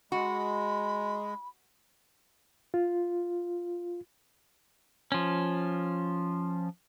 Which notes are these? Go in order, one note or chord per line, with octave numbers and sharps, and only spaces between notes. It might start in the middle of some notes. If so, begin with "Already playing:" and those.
G#3 F#4 B5
F4
F3 C#4